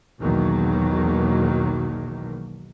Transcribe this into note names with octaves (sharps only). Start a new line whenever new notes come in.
B1 E2 B2 D#3 F#3 A#3